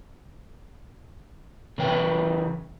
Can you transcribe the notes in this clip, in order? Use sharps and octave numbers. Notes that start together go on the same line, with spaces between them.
C#3 E3 B4 G5